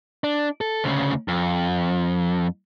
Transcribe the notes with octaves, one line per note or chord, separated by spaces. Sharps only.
D4
A4
D2 C#3
F2